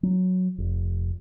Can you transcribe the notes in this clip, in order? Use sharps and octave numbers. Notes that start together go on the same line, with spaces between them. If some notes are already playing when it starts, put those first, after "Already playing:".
F#3
F1